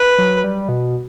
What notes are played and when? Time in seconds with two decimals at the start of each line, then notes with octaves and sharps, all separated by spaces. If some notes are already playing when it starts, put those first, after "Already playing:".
Already playing: B4
0.18 F#3
0.44 G3
0.69 B2